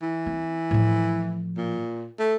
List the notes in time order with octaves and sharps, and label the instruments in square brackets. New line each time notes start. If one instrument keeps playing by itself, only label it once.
[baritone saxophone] E3
[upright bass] C4
A2 F3
[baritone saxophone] A#2
A3